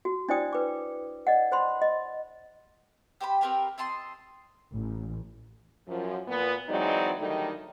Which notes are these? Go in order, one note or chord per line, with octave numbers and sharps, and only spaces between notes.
F#4
D4 E4 C5 D5 G5 D#6
B4 D6
D5 D#5 F#5
C5 B5 C6
D#5
G4 C5 F#5 B5
C4 G4 A#4 B4
C4 D#5 A5 C6
A1
F#2 F3
A#2 B3
E3 F#3 G#3 C4 D#4 D5
D3 D#3 F#3 G3 A3 D#4